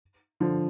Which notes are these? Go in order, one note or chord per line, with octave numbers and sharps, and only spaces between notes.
D3 F3